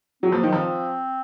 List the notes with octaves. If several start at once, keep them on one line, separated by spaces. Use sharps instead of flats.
F#3 C4
F3 A#3
D#3 F#3
F3 C4